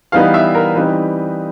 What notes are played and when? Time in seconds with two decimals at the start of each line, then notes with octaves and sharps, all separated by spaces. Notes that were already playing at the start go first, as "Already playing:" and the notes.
0.12 E3 G3 B3 D#4 F5
0.34 E5
0.55 A#4
0.75 E3 G3 C4 D#4 B4